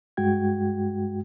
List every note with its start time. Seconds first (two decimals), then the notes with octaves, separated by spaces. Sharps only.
0.17 G2 G#3 F#4 G5 G#6